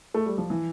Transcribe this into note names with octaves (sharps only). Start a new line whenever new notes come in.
A3
G3
F3
E3